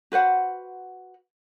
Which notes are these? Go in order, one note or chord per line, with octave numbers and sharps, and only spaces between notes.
F#4 B4 C5 F#5